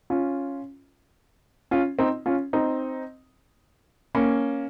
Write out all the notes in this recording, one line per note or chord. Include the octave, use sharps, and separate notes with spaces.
C#4 F4
C#4 F4
C4 D#4
C#4 F4
C4 D#4
A#3 C#4